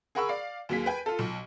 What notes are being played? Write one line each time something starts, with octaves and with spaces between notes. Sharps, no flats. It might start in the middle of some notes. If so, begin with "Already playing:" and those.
G#4 A#4 F#5 B5 C#6 E6
D5 F5
D#2 F#3 A#3 G#4 B6
B4 G5 G#5
F4 A4
B1